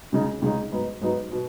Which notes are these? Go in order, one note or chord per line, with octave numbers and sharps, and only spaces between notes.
C#2 C#3 G#3 D#4
C#2 C#3 G#3 D#4
G#2 F#3 B3 D#4 B4
G#2 F#3 B3 D#4 B4
B2 B3